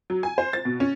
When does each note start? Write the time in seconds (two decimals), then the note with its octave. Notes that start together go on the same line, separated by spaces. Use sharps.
0.10 F#3
0.23 G#5
0.38 C5
0.53 A6
0.65 B2
0.80 C#4